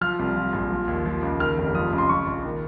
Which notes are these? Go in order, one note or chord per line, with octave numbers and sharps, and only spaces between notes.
F3 F6
C2
F3
A#1
F3
D#2
F3
C#2
D#3 F6
F1
F3 D#6
C#2
C6
F3 C#6
A#1
D#3